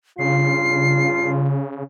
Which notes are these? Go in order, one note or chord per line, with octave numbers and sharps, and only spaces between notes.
G2 C#3 D4 F4 C7